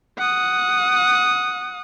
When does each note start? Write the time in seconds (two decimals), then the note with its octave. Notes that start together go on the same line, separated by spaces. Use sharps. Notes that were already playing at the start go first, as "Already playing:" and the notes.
0.18 F#5 D#6